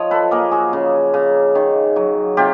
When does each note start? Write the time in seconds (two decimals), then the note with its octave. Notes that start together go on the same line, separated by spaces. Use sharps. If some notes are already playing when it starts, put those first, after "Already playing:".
Already playing: F3 C#5 D#5
0.11 A4 B4
0.31 A#3 G#4 A#4
0.51 F#4 G#4
0.73 C#3
1.14 C#3
1.55 D#3
1.96 F#3
2.37 C3 F4 G4